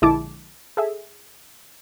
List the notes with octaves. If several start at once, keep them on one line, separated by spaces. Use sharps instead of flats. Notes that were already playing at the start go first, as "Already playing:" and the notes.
A#1 D3 G#3 E4 A5 D6
G#4 A4 E5